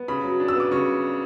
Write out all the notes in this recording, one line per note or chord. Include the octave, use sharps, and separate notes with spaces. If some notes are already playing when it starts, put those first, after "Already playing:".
Already playing: B3
C#3 B5
F#3
D4
E6
B3 D6
C#3 C#6